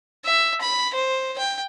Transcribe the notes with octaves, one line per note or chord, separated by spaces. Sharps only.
E5
B5
C5
G5